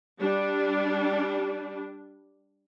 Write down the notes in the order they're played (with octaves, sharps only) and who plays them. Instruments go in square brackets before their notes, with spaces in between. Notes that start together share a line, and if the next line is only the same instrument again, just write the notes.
[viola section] G3 D4